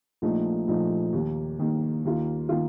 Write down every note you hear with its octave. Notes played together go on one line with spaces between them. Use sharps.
A#1 A#2 F3 A3 D#4
A#1 A#2 F3 A3 D#4
D#2 D#3 A#3
D#2 D#3 A#3
D#2 D#3 A#3 F4
D#3 A#3 F4